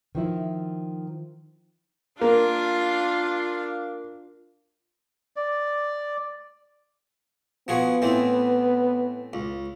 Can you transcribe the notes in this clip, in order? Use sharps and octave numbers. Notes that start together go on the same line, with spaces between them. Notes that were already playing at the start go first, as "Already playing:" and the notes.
D#3 F3 E4
A#3 D4 F4 F5
D5
F3 B3 F#4 G#4
A2 E3 C4
C#2